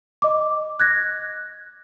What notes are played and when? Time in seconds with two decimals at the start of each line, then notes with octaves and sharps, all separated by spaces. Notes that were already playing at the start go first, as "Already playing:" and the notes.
0.22 D#5 D6
0.80 F#6 G#6 A#6